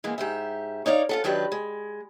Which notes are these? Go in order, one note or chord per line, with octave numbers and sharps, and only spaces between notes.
E3 G#3 A#3 B3
G#2 G4 E5
D#4 C#5 D5 F5
F4 F#4 A4
D#3 F#3 D4 G4 B4
G#3